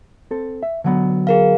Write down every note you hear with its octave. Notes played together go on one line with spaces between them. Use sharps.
C4 A4
E5
D3 F#3 B3
G#4 A#4 F5